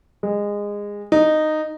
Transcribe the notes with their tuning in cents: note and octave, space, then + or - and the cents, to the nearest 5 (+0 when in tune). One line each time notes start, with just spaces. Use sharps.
G#3 -20
D#4 -10